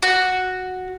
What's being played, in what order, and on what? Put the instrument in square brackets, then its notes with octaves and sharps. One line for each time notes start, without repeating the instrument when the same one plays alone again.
[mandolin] F#4